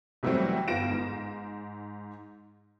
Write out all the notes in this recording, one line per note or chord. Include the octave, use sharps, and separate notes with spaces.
C3 E3 F#3 G3 A3 C4
G1 B3 F4 A#6 D7 E7
G#2